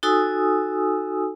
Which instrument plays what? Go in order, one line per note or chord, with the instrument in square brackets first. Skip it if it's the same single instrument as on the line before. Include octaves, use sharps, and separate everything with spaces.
[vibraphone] D#4 F#4 A4 G#5 D#6 E6